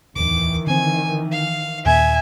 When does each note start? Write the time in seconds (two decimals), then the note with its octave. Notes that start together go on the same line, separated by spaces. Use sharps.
0.16 D1 E2 D#3 E3 D6
0.67 D3 C4 G#5
1.31 F5
1.86 D#2 A#2 A#3 E5 G#5